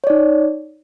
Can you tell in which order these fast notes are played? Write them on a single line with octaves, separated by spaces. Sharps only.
C#5 D5 D#4